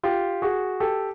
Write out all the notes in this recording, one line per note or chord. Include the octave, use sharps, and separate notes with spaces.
F4 G4
F#4 G#4
G4 A4